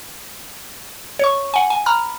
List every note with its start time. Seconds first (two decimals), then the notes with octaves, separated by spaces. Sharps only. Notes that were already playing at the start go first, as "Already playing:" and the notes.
1.19 C#5 C#6
1.54 F#5 G#5
1.70 G#5
1.86 A#5 B5 F6